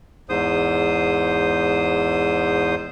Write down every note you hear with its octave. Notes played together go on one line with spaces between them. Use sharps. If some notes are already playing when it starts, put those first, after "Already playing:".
E2 G#2 C5 D#6